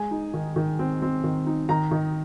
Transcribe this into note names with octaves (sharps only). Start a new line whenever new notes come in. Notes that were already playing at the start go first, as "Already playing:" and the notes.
Already playing: G#3 G#5
D#4
D#3
D#3
C4
C4
D#3
D#4
D#3 A#5
D#3